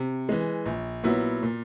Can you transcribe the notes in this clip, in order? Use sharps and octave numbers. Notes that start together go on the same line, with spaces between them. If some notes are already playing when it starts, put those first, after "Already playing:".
Already playing: C3
E3 G#3
A#1
A#2 F#3 B3 E4
A#2